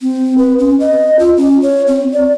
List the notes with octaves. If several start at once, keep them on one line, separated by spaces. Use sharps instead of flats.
C4
B4
C#4
D#5
F4
C#4
C#5
C4
D5